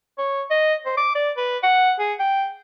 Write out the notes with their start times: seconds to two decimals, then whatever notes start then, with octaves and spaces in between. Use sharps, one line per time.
0.18 C#5
0.51 D#5
0.86 C5
0.97 D6
1.15 D5
1.37 B4
1.63 F#5
1.99 G#4
2.19 G5